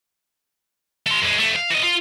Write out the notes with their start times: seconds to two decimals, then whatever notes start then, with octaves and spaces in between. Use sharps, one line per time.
1.07 A3 C6
1.22 F#2 G#3
1.39 F2 A3
1.56 F5
1.70 E3 D#5
1.83 F4